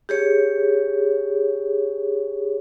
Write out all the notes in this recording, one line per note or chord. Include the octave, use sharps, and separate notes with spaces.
G4 G#4 C#5